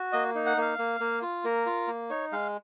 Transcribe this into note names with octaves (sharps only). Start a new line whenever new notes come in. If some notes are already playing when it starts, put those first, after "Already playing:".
Already playing: F#4
A#3 D#5
D#4
F#5
A#3 F5
A#3
A#3
F4
A#3 A#4
F4
A#3
D#4 C#5
G#3 F5